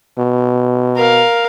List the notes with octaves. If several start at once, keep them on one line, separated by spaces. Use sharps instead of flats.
B2
A#4 F5